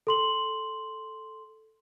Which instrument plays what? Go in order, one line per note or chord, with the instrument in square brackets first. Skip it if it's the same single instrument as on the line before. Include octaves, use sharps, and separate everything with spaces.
[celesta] A4 C6 F#7